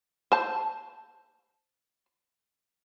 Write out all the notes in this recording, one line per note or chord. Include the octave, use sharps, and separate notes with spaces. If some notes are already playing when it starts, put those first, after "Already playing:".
C5 A5